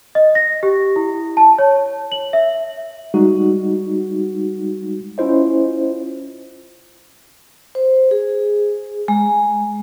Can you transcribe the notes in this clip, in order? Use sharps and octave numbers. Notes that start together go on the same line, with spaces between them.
D#5
A#6
G4
E4
A5
C#5
F#7
E5
G3 G#3 D#4 F#4
C#4 E4 F4 C5 D#5
C5
G#4
G#3